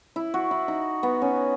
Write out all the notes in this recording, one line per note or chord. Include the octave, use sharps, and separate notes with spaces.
E4
F#4
E4
D#4
B3
C#4